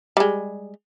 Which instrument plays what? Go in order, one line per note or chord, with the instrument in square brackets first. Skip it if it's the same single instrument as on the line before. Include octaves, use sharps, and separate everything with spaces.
[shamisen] G3 G#3